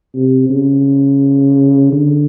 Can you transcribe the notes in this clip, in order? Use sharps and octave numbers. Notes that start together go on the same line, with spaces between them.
C3
C#3
D3